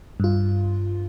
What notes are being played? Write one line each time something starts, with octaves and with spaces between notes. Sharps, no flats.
G2 F4